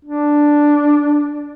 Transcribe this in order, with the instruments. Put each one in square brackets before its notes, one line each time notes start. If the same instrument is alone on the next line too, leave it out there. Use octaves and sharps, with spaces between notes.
[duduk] D4